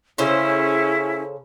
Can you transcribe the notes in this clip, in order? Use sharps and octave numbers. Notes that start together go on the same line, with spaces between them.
C#3 C#4 E4 A4 C5